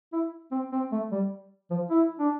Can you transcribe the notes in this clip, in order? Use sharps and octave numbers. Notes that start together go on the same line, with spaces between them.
E4
C4
C4
A3
G3
F3
E4
D4